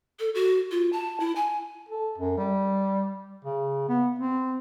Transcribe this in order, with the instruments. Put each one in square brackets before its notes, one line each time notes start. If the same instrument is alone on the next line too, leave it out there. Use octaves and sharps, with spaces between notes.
[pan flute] A4
F#4
F4
A5
E4
G#5
[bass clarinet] A4
F#2
G3
C#3
B3
C4